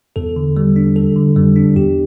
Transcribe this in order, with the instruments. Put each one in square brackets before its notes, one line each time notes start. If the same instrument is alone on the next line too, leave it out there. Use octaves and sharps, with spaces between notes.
[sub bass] E2 [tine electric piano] A4
[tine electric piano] D3
G3
D4
A4
D3
[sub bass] F2 [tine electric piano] G3
[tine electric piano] D4
[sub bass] E2 [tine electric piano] G4